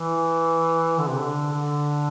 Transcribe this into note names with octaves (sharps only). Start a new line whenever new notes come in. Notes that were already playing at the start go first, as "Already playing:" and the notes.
Already playing: E3
D3
C3
D3
D3